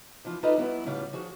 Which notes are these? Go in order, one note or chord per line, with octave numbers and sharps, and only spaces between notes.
E3 F3 F4
D#4 F4 A4 B4 D5 D#5
G2 F#3 B3 E4
A2 C#3 G3 F4 F#5
F3 F#4 G#4